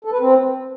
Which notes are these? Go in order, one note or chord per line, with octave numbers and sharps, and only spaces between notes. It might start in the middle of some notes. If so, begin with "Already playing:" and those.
A4
B4
C4